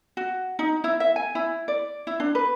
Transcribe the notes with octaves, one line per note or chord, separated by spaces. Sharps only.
F#4
D#4
E4
E5
G#5
E4
D5
E4
D4
B4